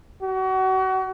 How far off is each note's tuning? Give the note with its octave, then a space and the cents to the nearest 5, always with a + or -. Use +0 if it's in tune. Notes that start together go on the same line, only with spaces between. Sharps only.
F#4 +35